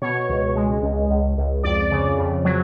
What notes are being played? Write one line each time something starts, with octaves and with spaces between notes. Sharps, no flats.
B2 C#5
C#2
G#3
C#2
C#2
C#2
F2 D5
C#3
F2
F#3